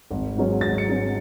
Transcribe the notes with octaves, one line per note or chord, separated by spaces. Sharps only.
G#1
G#2 F#3 C#4
G#1 A6
C#7
G#2 F#3 C#4